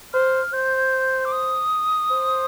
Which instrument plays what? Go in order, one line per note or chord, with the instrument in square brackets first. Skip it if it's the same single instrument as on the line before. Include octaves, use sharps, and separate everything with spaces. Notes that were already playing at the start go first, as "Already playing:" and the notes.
[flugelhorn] C5 [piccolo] F6
[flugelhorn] C5 [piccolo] G6
[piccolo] D6
D#6
[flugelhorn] C5